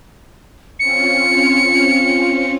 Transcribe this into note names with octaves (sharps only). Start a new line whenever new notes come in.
C4 C#4 F4 C#7